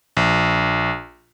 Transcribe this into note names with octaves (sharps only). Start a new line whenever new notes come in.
A#1